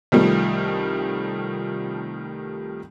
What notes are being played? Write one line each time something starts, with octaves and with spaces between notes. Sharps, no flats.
C2 D#3 F3 G3 A3